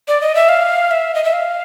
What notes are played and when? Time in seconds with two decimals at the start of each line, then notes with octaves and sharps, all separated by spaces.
0.08 D5
0.21 D#5
0.35 E5
0.49 F5
0.91 E5
1.15 D#5
1.24 E5
1.33 F5